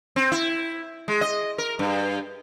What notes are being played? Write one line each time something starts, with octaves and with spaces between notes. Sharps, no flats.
C4
E4
G#3
D#5
A#4
G2